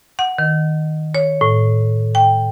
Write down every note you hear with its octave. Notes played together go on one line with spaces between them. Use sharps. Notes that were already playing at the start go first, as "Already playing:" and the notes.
F#5
D#3
C#5
A2
G5